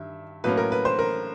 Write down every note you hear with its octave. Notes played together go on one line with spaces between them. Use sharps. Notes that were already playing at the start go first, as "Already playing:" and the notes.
Already playing: G2 D#3 G3 E5
A2 F#3 A#3 C#4 B4
A#4
B4
C5
A#4